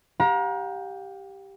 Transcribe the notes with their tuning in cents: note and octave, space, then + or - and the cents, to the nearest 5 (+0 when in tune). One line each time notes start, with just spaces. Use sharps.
G4 +0 F5 +45 A#5 +30